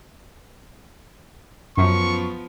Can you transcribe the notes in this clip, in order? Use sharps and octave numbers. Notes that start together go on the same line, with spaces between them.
F#2 F3 B3 C#6